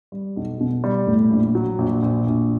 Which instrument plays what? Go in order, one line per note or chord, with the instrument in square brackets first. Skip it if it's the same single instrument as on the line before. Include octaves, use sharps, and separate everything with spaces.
[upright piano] G3
B1
B2
G3
A2
A#1
F#3
A#1
A#1
A#1